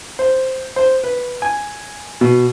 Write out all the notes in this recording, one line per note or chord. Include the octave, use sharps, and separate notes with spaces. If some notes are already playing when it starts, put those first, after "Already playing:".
C5
C5
B4
G#5
B2